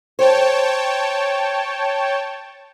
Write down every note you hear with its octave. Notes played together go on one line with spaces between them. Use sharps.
C5 C#5 G5 A5